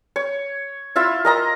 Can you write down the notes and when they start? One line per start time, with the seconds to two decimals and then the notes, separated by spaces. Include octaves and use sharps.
0.16 C#5
0.96 E4 F4 E5
1.25 A#4 D#5 A#5